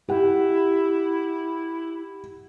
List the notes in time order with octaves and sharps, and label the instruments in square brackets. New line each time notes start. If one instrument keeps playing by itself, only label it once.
[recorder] E4 [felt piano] G4 F#5